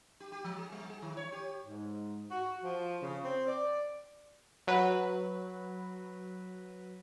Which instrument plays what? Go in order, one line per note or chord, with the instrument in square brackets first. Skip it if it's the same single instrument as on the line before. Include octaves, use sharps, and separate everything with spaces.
[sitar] G4
G4
F3
G#4
G3
G#4
D#3
C#5
G4
[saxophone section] G#2
F#4
F3
C#3
C4
D5
[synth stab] F#3 B4